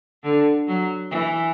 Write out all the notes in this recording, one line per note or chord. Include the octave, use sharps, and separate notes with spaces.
D3
F#3
E3